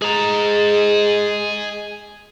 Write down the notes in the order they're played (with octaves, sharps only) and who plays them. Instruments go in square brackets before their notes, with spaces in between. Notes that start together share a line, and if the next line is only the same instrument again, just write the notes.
[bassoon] G#3 [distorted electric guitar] G#4 A#5